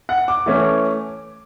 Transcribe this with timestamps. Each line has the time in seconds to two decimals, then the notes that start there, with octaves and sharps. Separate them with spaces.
0.09 F#5
0.28 D6
0.46 E3 A3 C#4